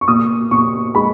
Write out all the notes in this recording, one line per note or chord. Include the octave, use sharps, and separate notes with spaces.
C#6
A#2 D#6
A#2 C#6
G#3 B5